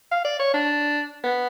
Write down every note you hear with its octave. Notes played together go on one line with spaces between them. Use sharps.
F5
D5
C#5
D4
B3